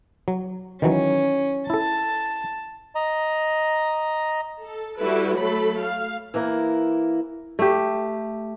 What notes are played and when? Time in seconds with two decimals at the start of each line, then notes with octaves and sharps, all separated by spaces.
0.28 F#3
0.82 D#3 E3 F#3 C#4
1.70 E4 A4 A5
2.95 D#5 A#5
4.63 A4
4.99 G3 E4 F#4 A4 B4
5.37 F#3 A3 A4 B5
5.80 F5
6.34 E3 A#3 E4 A#4
7.59 A3 G4